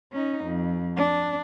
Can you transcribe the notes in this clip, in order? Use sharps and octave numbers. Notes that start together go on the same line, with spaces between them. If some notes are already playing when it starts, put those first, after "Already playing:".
C#4 D#4
F2
D4